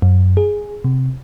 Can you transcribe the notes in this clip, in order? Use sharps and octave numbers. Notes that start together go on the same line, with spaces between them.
F#2
G#4
C3